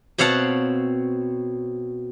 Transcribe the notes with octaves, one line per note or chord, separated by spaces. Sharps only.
B2 C4 C#5 F5 F#5 A5